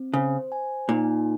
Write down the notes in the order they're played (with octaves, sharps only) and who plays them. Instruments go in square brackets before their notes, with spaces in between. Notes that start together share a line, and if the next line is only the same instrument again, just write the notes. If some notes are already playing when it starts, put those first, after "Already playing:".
Already playing: [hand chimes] C4
[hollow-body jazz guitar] C#3 [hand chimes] C5
[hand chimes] G#5
[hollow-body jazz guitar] A#2 [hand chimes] D#4